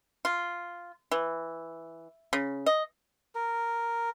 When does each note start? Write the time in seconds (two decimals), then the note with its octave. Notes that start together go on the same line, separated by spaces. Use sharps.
0.25 F4
1.12 E3
2.33 C#3
2.66 D#5
3.35 A#4